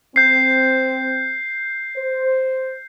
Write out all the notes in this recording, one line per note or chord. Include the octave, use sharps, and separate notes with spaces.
C4 G6 C7
C5